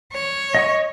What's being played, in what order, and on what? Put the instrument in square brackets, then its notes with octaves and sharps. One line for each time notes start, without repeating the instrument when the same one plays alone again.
[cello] C#5
[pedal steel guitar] D#5 C#6